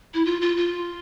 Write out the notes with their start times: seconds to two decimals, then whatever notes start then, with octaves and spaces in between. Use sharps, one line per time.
0.14 E4
0.25 F4
0.41 F4
0.57 F4